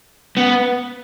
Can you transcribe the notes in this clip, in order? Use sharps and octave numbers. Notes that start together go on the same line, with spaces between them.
B3